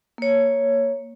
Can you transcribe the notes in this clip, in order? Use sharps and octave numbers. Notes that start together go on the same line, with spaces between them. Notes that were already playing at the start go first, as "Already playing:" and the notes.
A#3 C#5